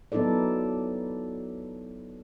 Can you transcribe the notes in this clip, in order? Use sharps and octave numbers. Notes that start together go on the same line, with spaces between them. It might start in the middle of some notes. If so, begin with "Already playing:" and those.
F#3 B3 D#4 E4 A4 D5